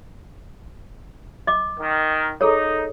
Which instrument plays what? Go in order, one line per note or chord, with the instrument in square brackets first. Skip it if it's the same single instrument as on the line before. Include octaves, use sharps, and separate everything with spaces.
[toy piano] D#5 D6
[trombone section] D#3
[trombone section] D#4 [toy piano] G#4 A4 C#5